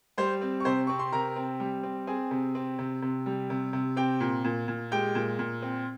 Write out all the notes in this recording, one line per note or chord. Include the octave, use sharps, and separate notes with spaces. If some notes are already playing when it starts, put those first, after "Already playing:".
G3 C5 C6
C4
C#6
C3 C5 C6
C4 C#6
C6
C3 A#4 A#5
C4
G3
C4
C4 G#4 G#5
C3
C4
C3
C3
G3
C3
C3
C4 G4 G5
A#2
A#2
A#2
G#3 G4 G5
A#2
A#2
C4